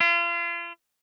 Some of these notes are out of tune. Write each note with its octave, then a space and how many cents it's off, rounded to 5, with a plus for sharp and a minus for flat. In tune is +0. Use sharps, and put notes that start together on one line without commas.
F4 -35